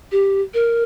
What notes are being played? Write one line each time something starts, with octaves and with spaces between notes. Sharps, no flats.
G4
A#4